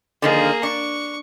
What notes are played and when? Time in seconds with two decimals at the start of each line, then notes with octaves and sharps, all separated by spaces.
0.22 D3 D#3 F3 A#3 G#4
0.63 D4 C#6